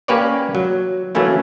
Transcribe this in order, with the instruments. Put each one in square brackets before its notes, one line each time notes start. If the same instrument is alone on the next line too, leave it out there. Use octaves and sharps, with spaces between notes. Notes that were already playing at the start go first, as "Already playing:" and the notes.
[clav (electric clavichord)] A#3 C#4 G4 B4 C#5 D5
F#3
E3 F#3 A3 A#3 C#4 E4